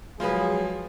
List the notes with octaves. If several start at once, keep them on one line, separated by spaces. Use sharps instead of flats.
F3 F#3 G#3 F4 G#4 B4 B5